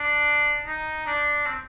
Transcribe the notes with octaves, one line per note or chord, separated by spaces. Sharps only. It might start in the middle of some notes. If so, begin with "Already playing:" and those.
Already playing: D4
D#4
D4
C4